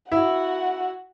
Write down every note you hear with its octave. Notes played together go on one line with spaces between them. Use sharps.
E4 F#4 F#5